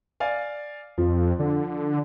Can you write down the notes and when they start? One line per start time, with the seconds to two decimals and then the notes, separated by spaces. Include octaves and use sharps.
0.20 D5 F5 G#5
0.98 F2 F3
1.39 D3